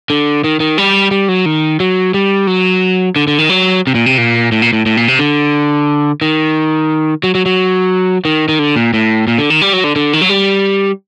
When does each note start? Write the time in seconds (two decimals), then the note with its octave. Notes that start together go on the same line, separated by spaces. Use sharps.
0.10 D3
0.44 D#3
0.60 D#3
0.78 G3
1.11 G3
1.29 F#3
1.46 D#3
1.80 F#3
2.14 G3
2.47 F#3
3.16 D3
3.27 D3
3.39 D#3
3.49 F#3
3.87 C3
3.95 A#2
4.06 C3
4.18 A#2
4.52 A2
4.62 A#2
4.73 A2
4.86 A2
4.97 A#2
5.08 C3
5.19 D3
6.21 D#3
7.23 F#3
7.35 F#3
7.46 F#3
8.25 D#3
8.49 D#3
8.59 D3
8.76 A#2
8.94 A2
9.28 A#2
9.38 D3
9.50 D#3
9.61 G3
9.73 F#3
9.84 D3
9.96 D3
10.13 D#3
10.21 F#3
10.29 G3